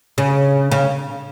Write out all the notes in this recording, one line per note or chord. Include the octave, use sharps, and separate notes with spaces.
C#3
C#3